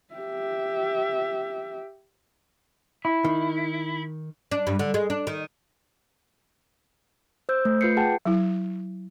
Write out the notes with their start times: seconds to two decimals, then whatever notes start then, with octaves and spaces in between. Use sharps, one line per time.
0.14 G4 E5
3.05 E4
3.25 D#3
4.51 D4
4.67 G2
4.79 D3
4.94 G#3
5.10 D4
5.27 D#3
7.49 C5 E6 G6
7.65 A3
7.81 F4 B4 G6 C7 C#7
7.97 G#4 F#5 G5 A5
8.25 F#3 E4